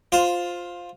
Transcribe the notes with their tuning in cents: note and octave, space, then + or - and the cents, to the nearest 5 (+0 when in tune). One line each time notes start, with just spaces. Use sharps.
F4 +10 C5 +0